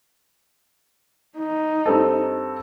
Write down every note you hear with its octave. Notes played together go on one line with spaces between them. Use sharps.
D#4
G2 C4 A4